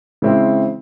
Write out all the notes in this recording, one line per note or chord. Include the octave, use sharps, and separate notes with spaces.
C#3 E3 G#3 C4 E4